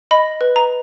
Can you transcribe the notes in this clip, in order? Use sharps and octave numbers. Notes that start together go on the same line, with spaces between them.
D#5 B5
B4
A#5